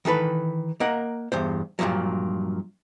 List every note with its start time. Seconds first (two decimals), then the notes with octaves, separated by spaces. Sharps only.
0.05 D#3 E3 A4 B4
0.80 A#3 A#4 D#5 F#5
1.32 E2 G2 C5
1.79 G2 A#2 C#3 F3 F#3